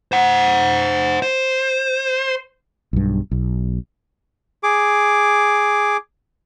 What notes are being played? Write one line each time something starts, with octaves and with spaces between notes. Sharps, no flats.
C5 F#5
C5
B1 G2
B1
G#4 D6